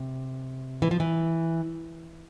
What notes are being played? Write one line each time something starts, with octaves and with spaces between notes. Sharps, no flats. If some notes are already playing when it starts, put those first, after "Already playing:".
Already playing: C3
E3
F3
E3